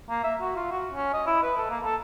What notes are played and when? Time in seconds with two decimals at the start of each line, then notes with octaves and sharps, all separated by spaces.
0.09 A#3
0.23 E5
0.41 F#4
0.56 F4
0.72 F#4
0.92 C#4
1.13 D#5
1.26 E4
1.43 B4
1.57 A4
1.70 A#3
1.84 A4